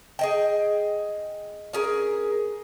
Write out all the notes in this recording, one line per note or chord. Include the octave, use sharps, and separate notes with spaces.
G#4 D#5 G5
C#4 G#4 A#4